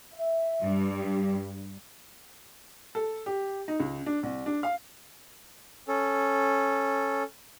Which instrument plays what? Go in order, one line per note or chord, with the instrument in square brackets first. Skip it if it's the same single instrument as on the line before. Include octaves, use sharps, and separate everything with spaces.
[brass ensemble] E5
[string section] G2
[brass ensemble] G3 G4
[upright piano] A4
G4
D#4
C#2
D4
C2
D4
F5
[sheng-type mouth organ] C#4 A4